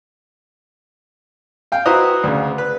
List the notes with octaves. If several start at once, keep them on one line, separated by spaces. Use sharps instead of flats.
F5 G5
E4 F#4 B4 C5 D#5 A#5
D2 C#3
B4